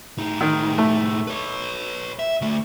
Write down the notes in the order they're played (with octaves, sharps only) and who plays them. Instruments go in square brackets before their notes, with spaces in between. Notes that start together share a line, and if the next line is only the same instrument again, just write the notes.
[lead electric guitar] A2 D#4
[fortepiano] D#3
A3
[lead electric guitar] B4 C#5
E5
D2 A3